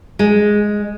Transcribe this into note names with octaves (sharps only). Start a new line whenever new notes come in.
G#3